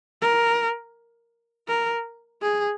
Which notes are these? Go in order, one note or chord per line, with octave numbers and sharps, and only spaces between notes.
A#4
A#4
G#4